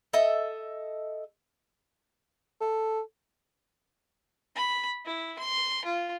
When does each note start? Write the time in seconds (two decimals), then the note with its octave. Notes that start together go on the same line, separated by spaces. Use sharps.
0.13 A4 D#5 E5
2.61 A4
4.55 B5
5.05 E4
5.39 C6
5.85 F4